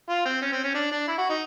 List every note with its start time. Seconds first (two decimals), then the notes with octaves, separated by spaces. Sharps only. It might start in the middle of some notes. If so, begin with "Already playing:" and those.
0.09 F4
0.25 C4
0.42 C#4
0.52 C4
0.64 C#4
0.74 D4
0.92 D4
1.08 E4
1.18 F#4
1.30 D#4